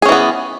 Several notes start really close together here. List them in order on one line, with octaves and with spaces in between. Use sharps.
G#4 C#4 E3 B3